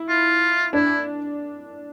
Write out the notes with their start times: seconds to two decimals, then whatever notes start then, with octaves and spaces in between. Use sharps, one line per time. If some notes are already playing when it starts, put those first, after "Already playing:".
Already playing: E4
0.09 F4
0.73 D4 E4